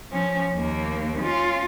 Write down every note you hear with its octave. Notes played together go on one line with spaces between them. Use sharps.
F3 C#4
D#2 A#3
C#4 F4